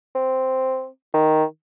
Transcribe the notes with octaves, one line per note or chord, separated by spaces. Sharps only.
C4
D#3